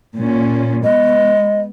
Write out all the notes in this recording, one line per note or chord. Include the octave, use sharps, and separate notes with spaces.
A#2 C#4
G#3 B3 D#5